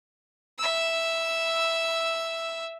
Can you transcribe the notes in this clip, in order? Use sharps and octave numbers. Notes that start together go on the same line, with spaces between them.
E5 E6